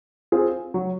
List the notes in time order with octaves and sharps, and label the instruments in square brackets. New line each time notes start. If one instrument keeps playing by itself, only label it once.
[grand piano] C4 F4 G#4
F#3